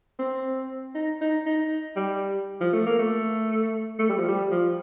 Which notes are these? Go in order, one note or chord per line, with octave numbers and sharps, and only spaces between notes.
C4
D#4
D#4
D#4
G3
F3
A3
A#3
A3
A3
G3
F3
G3
F3